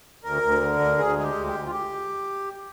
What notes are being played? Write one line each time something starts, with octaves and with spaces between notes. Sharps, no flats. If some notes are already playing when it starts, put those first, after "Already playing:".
D2 A#4
D2
D3
D2
D2 G#4
G#3 G#4
G4
D2
G4
D2
F4
G4